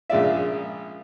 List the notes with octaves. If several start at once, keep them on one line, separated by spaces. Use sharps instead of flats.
A#1 C#3 G#3 F4 D5 E5